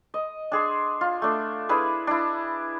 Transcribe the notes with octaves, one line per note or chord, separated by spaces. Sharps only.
D#5
D4 G#4 C6
F4
A3 D4
D4 E4 G#4 B4
D4 E4